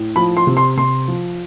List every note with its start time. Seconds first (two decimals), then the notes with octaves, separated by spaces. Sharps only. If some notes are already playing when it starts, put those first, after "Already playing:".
Already playing: A2
0.16 F3 B5
0.37 C6
0.47 C3
0.57 C6
0.77 C3 C6
1.08 F3